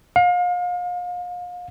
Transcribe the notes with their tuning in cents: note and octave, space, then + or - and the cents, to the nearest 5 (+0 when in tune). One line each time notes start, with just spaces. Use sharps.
F5 +35